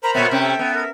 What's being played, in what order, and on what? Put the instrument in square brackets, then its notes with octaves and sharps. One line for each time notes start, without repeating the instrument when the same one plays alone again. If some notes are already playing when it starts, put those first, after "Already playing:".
[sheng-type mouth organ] A#4 C5 B5 [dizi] A#5
[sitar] A#2 B3 [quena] C#5 [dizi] E5
[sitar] C3 C#4 [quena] G5
[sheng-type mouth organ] A4
[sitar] B3
[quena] A#4